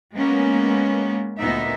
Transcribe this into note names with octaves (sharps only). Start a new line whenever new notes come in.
G#3 A#3 B3 C#4
D2 A#2 B3 D#4 E5